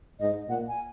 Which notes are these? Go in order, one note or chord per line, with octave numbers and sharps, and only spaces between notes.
G#2 D#5
A#2 F#5
G#5